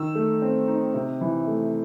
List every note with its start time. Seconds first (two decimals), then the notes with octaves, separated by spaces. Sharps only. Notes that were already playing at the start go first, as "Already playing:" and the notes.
Already playing: D#3 E6
0.15 A3
0.42 C4
0.67 D#4
0.94 C3
1.21 E3
1.47 A3